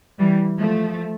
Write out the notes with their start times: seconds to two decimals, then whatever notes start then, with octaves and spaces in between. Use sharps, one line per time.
0.19 E3 G3
0.59 F3 A3